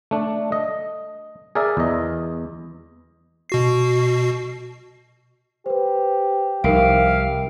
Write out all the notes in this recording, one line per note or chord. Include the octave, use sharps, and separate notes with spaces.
A3 D4
D#5
G#4 A#4 D5 E5 G#5
E2 D#5
B2 F#4 C7
G4 B4 C5
C2 F3 D#4 A#4 E5 F5 D7